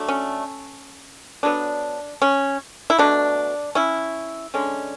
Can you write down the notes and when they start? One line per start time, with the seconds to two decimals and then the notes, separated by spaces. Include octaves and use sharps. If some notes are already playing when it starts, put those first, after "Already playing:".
Already playing: D3 F#3 A3
0.08 C#4
1.43 D3 F#3 B3 D4
2.22 C#4
2.90 E4
2.99 B2 F#3 A3 D4
3.75 C#4 E4
4.54 D3 G#3 C#4